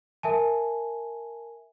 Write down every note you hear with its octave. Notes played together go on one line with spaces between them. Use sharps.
A#4 E5 G#5 A5